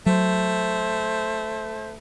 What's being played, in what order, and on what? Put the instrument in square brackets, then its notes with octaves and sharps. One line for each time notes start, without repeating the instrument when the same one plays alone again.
[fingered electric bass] F#3 [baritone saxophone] A3 [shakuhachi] C5